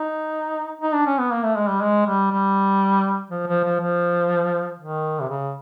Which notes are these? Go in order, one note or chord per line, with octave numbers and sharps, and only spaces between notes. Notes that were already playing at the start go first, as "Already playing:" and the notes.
Already playing: D#4
D#4
D4
C#4
B3
A#3
A3
G#3
G3
G#3
G3
G3
F3
F3
F3
F3
D#3
C3
C#3